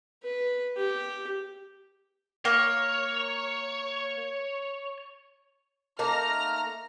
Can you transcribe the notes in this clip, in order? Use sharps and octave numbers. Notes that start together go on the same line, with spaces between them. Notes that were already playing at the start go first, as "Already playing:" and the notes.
B4
G4
A#3 C#5
A3 A#3 D#4 A#5 F6